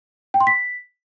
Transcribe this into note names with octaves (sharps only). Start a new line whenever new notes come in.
G5
C6
B6